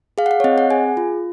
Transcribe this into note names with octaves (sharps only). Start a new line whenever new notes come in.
G#4 F5
F#5
F5
C#5
C4 D#5
F#5
G#4 G#5
F4